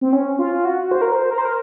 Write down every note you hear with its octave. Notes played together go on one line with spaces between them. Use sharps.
C4
C#4
F4
F#4
C5
A#4
C5
A#4
C5
A#4